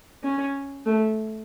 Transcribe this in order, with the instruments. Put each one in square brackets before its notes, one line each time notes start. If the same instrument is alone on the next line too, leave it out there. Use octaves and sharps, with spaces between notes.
[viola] C#4
A3